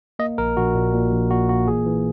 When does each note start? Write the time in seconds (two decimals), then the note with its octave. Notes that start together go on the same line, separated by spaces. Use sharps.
0.19 A#3 D#5
0.38 A#1 A#4
0.57 A#1 F#4
0.75 A#2
0.94 A#2
1.13 A#1
1.31 A#2 F#4
1.49 A#3 F#4
1.67 E3 G#4
1.86 E3